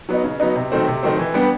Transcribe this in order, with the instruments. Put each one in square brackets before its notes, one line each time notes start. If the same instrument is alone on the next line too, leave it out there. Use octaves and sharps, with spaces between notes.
[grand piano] F#3 B3 D#4
C#3
F#3 B3 D#4
C3
D#3 F#3 A3 C4
C3
D#3 F#3 A3 C4
E3
G3 B3 D4 G4